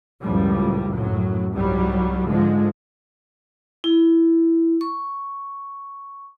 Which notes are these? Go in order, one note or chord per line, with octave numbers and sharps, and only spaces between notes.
C#2 F#2 A2 F3 G3
F#2 A2 F#3
C2 G#2 F#3 G3
G#2 D3 F3 G#3
E4
C#6